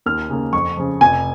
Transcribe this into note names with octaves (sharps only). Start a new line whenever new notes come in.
D#2 F6
C#3 A#3
F2 C#6
C#3 F3
F1 G#5